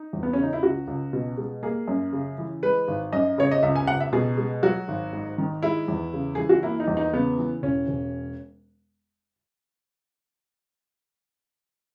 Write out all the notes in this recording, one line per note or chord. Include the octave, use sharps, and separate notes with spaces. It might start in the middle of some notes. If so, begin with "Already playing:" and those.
Already playing: D#4
E2
B3
C#3 C#4
D#4
E4
C#2 F#4
C#2
B2
G#3
A#3 G#4
F#2
C#3
E3
G#3 B4
G#1
F#2 D#5
C#3 C#5
D#5
C#2 E5
G#5
C#2 F#5
E5
B2 G#4
G#3
F#3 F#4
G#1
G#2
D#3
G#3 E4
E2
C#3
E3 G#4
F#4
A#3 E4
D#4
E2
D#4
C#3 B3
E3
E1 C#4
E1